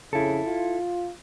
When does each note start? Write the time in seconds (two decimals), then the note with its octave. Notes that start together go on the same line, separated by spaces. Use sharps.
0.13 F2 C#3 E4 A4
0.47 F4